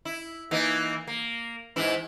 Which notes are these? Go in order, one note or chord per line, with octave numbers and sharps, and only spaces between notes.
E4
E3 A#3 D#4
A#3
G#2 E3 E4